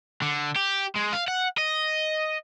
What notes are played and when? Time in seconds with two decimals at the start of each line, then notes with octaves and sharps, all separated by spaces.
0.22 D3
0.56 G4
0.96 G#3
1.13 F5
1.28 F#5
1.58 D#5